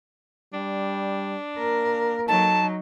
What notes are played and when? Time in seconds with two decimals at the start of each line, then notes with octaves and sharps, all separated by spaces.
0.53 G3 D4
1.58 A#3 A#4
2.28 F#3 D#4 A4 A5